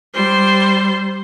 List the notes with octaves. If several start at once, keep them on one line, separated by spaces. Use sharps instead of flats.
G3 C5